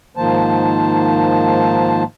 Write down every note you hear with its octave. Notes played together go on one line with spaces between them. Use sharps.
G#2 D#3 F3 A#3 C5 A5